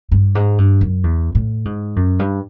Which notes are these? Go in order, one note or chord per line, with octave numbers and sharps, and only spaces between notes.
G2
G#2
G2
F#2
E2
A2
G#2
F#2
G2